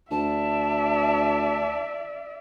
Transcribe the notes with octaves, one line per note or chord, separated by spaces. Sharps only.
D2 D5 E5 A5